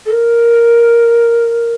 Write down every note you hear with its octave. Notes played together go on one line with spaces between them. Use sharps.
A4
A#4